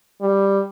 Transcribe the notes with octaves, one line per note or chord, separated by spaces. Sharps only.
G3